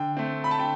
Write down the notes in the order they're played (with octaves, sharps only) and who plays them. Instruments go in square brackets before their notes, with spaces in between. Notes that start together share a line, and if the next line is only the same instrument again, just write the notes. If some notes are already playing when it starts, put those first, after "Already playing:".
Already playing: [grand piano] D3 G5
A3 C4
B5
A5
D3 G5